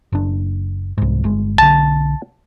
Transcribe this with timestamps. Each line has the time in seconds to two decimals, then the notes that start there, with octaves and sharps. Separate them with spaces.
0.12 F#1 D4
0.98 C2 G#2
1.24 G1 G#3
1.58 B1 D3 A5